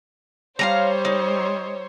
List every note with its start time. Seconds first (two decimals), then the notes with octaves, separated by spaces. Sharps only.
0.59 G3 C5 C#5 F5 G#5 A#5
1.05 D#4